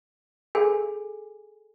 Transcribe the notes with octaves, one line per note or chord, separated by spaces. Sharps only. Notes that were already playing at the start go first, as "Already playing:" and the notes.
G#4 A4 G#5